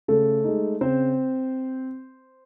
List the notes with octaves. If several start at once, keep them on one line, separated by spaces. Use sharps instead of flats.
C#3 A3 A4
G#3 D#4
C#3 C4 C5